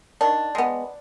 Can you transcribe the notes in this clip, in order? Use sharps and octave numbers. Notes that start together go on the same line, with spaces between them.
D#3 D4
G#3 B3